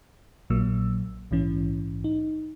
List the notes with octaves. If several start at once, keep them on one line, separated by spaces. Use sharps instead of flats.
A#1 A#2 F#3 A#3 E6
A#1 G#2 E3 C#4
D#4